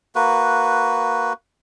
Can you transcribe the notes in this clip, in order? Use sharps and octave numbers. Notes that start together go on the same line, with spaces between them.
A#3 F#4 B4